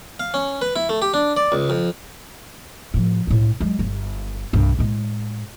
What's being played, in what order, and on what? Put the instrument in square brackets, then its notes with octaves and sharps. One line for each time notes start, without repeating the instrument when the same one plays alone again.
[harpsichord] F5
C#4
B4
E4
A3
G4
D4
D5
C#2
F2
[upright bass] A2 F3
C#2 A2
F#3 G#3
G1
C2 G2
A2 G#3